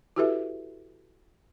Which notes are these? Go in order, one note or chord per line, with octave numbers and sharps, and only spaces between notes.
E4 F#4 G4 A4 B4 E5